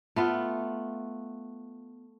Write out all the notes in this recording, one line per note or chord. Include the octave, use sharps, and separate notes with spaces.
A3 B3 F4